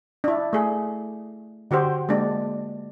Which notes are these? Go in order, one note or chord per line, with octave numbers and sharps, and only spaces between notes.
D4 E4
A3 G#4
D3 F#4 G4 C5
G#3 A#3 D4